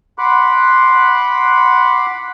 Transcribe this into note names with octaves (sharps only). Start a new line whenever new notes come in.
F#5 B5 C6 D6 F#6